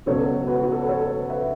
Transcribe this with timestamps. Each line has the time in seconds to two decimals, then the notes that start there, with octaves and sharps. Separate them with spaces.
0.06 C#2 B2 F#3 A4 C#5
0.47 F#4 B4
0.63 F#4
0.72 A4
0.81 B4
0.88 A4 C#5
1.29 B4 E5